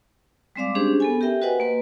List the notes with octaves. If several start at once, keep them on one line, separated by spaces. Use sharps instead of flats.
G3 G#3 C4 D5 F5 D6
C#4 D4 G4 G#4 C5
B3 A4 G#5
G4 A#4 E5 G5
F#4 B4 C5 D#5 F#5 G#5
A#3 B4